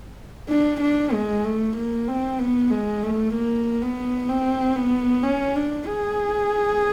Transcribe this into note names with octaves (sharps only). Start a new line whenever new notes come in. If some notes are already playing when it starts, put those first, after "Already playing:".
D4
D4
G#3
A3
A#3
C4
B3
G#3
A3
A#3
B3
C4
B3
C#4
D4
G#4